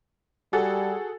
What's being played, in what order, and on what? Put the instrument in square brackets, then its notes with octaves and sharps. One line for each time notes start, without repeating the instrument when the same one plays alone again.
[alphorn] G3 [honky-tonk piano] F#4 G#4 A4